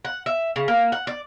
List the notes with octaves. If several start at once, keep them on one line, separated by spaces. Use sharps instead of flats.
F#5
E5
C#3
A#3
F#5
D5